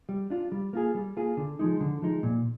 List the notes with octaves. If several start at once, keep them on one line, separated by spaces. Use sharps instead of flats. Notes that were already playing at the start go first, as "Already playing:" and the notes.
G3
D4 F4
G3
A#3 F4 G#4
G3
A#3 F4 G#4
D3
F3 G#3 D#4
D3
F3 G#3 D#4
A#2